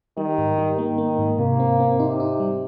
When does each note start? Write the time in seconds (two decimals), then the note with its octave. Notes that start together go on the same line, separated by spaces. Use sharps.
0.18 D#3 G3
0.38 G#2
0.58 G3
0.78 D#3 A#3
0.98 A#3
1.19 G#2
1.39 C3 A#3
1.60 C4
1.80 C4
1.99 C3 D#4
2.20 D#4
2.40 G3